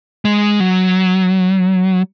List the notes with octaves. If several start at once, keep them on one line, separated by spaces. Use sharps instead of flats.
G#3
F#3